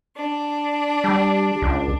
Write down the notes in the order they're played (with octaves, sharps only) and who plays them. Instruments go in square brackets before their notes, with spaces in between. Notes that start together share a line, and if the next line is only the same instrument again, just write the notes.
[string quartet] D4
[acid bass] G3
C#2